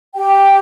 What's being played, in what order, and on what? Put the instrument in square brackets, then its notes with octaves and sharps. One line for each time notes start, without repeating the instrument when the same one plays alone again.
[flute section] G4 G5